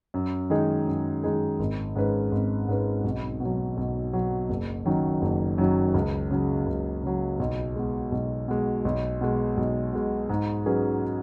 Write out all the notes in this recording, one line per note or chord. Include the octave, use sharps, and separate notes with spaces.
F#2
D#3 G#3 D#4 G#4
F#2
D#3 G#3 D#4 G#4
G#1
G#2 G#3 C#4 B4
G#1
G#2 G#3 C#4 B4
B1
B2 F#3
B1
B2 F#3
F#1
F#2 D#3 F#3
F#1
F#2 D#3 F#3
C#2
C#3 F#3
C#2
C#3 F#3
B1
B2 G#3
B1
B2 G#3
B1
B2 G#3
B1
B2 G#3
G#2
F#3 C#4 G#4 B4